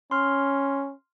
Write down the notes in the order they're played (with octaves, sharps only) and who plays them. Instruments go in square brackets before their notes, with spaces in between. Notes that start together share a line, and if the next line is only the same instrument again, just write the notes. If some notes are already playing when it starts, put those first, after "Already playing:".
[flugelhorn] C#4 [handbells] C6 F6